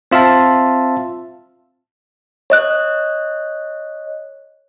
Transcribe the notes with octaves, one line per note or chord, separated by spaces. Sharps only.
C4 F4 E5 F5 A5
C#5 D#5 F#6